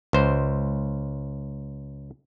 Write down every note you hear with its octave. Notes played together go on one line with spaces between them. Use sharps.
C#2 C5